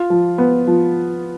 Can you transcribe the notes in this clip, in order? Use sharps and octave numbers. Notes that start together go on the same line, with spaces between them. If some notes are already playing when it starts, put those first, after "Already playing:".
Already playing: F4
F3
B3
F3